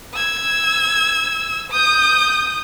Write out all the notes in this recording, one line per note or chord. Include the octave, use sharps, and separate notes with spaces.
E6 G#6
D#6 G6